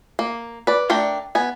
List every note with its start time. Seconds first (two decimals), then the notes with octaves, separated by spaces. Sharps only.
0.19 A#3
0.67 B4 D5
0.89 A3 D4 A4 A#4 G5
1.35 B3 G#5